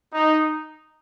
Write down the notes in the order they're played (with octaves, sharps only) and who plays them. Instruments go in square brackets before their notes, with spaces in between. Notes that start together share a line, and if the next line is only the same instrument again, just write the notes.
[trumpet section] D#4